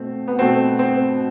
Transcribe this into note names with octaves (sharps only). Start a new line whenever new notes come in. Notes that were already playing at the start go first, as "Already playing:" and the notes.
Already playing: B2 A3 C4
B3
B2 A3 C4
C4